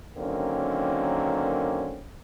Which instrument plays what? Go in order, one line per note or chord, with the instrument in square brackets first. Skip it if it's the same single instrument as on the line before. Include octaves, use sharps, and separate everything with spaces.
[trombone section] D3 D#3 F#3 A#3 C4 C#4